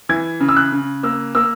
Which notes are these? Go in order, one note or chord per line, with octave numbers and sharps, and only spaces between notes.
E3 G#6
C#3
E6
F#6
C#3
A#3 E6
A#3 E6